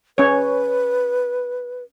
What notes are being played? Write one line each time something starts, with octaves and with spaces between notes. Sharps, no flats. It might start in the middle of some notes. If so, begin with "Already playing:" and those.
C#4 B4 C#5